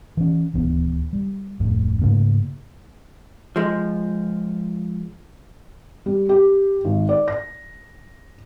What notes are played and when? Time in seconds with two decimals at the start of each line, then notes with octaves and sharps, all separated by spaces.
0.17 E3 C#4
0.54 D#1 D2 E3 B3
1.13 G3
1.60 D1 F2 A2
2.02 G#2 C#3 A3 A#3
3.56 F3 G#3
6.06 G3
6.29 G4
6.85 G#1
7.09 D5
7.28 A#6